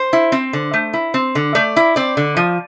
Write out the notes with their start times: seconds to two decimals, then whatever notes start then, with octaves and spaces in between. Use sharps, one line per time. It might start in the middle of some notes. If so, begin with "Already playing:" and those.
Already playing: C5
0.13 E4
0.32 C4
0.53 D3
0.74 A3
0.94 E4
1.14 C4
1.35 D3
1.55 A3 D5
1.76 E4
1.96 C4 D5
2.17 D3
2.37 F3